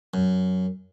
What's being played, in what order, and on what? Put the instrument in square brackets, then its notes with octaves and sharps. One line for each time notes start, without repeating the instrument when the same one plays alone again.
[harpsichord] F#2